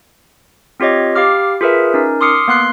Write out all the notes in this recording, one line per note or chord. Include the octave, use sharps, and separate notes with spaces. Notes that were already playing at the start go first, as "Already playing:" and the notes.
C4 F4 G4 C#5 D#5
G4 F5 B5 D6 F6
F4 G#4 A#4 B4 E5
C#4 D#4 A#4
C6 D6 D#6 F6 C7 C#7
A#3 B3 C6 F#6 C7